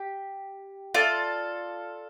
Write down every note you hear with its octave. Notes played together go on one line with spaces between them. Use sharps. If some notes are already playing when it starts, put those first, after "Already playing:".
Already playing: G4
F4 A4 D5